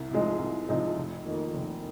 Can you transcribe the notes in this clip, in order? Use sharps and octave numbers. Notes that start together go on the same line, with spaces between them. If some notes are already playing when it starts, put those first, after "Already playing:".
Already playing: C2
C3 F3 G#3 D#4
C2
C3 F3 G#3 D#4
F1
F2 D#3 A#3
F1